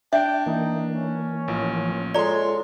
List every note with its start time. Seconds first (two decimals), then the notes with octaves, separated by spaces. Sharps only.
0.13 D4 E5 G5
0.46 E3 A#3 D#4
0.95 C#4
1.48 A1 F3
2.14 G#3 F4 A4 C#5 D5 A#5 C6